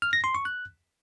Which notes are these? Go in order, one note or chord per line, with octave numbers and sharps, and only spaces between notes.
F6
A#6
C6
C#6
F#6